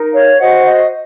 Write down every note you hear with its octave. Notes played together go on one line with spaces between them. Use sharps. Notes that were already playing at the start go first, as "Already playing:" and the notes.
Already playing: D#4 A#4
C#5 F5
F#4 C5 D#5 F#5
D#5